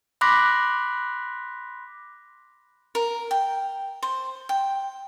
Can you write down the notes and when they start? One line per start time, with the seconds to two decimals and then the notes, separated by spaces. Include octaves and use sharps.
0.21 B5 C6 D6 F#6 A#6 B6
2.95 A#4
3.31 G5
4.03 C5
4.49 G5